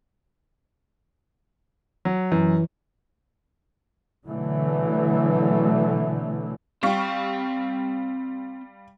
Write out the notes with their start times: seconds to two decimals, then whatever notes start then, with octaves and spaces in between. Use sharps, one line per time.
2.05 F#3
2.32 F#2 E3
4.27 B2 D3 E3 F#3 A3
6.83 G3 C4 F5 G5 C#6